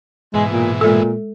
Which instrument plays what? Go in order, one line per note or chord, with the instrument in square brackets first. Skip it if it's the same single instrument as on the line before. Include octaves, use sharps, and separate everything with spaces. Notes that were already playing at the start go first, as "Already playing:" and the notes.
[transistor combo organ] G#2 B2 E3 [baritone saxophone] G#3
[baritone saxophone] A#2
[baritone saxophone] A#2 [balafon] G#3 A4